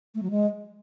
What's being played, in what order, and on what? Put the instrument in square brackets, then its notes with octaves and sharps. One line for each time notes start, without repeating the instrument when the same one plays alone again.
[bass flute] A3
F#3
G#3